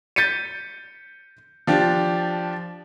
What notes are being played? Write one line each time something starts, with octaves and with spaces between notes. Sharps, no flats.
G6 A6 B6 C#7 D#7
F3 D4 G4